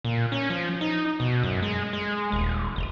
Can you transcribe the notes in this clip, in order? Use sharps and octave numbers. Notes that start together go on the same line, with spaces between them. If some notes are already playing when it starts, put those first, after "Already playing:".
A#2
C#4
F3
D#4
B2
F#2
G#3
G#3
D#1
F1